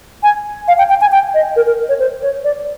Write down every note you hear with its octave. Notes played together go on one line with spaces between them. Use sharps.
G#5
F5
G5
G5
G#5
G5
D#5
A#4
A#4
C#5
C5
C#5
D5